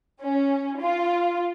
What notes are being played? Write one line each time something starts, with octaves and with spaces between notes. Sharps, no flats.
C#4
F4